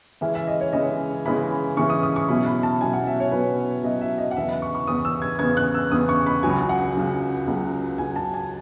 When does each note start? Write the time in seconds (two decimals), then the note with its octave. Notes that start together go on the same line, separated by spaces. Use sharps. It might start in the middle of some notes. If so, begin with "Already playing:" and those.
0.21 C#3 E3 G#3 C#4 E4 E5
0.35 E5
0.47 D#5
0.61 C#5
0.73 C#3 E3 G#3 C#4 E4 D#5
1.25 C#3 E3 G#3 C#4 E4 B5
1.77 C#3 E3 G#3 C#4 E4 C#6
1.90 D#6
2.03 D#6
2.16 C#6
2.29 B2 F#3 C#4 E4 B5
2.46 B5
2.63 A5
2.81 B2 F#3 C#4 E4 G#5
2.93 F#5
3.07 E5
3.20 C#5
3.32 B2 F#3 C#4 E4 B4
3.84 B2 F#3 C#4 E4 D#5
4.01 E5
4.18 D#5
4.31 F#5
4.36 E2 C#3 E3 B3 E5
4.49 B5
4.62 C#6
4.74 C#6
4.87 E2 C#3 E3 B3 D#6
5.05 E6
5.22 G#6
5.39 E2 C#3 E3 B3 G#6
5.57 F#6
5.75 E6
5.91 E2 C#3 E3 B3 D#6
6.09 C#6
6.26 B5
6.43 C#2 C#3 F#3 G#5
6.69 F#5
6.95 C#2 C#3 F#3
7.47 C#2 C#3 F#3
7.98 C#2 C#3 F#3 G#5
8.16 A5
8.34 G#5